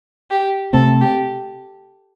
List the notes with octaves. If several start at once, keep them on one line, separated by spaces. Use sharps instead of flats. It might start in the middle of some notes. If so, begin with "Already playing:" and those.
G4
C3 A3 C4 A4
G4